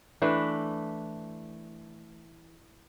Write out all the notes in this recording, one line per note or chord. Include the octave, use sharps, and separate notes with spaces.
E3 A3 D4 B4